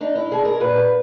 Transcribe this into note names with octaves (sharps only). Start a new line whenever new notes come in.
D4 D#4
E4
B2 G#4
A#4
A#2 B4